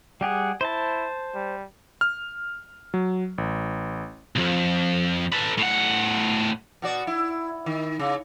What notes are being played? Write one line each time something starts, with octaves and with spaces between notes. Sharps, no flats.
G3 G4 G#4 F#5
E4 C5 A5
G3
F6
F#3
A1
B1 F2
A4 B4
A2 F#5
B2 F#4 D5
E4
D#3
C#3